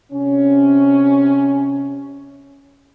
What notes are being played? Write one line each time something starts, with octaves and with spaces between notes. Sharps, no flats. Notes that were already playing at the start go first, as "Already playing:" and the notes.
C3 C#4